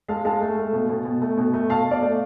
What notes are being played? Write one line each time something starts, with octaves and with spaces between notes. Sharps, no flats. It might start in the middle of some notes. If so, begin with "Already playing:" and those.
G#3 F5 A5
G#3 F5 A5
A3
A3
B2
B2
B2
A3
B2
A3
B2 F5 A5
B2 D5 F5
A3